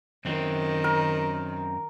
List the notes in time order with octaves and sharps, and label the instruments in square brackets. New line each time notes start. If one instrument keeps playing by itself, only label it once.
[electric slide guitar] F#2 C4 [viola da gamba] D#3
[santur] A#4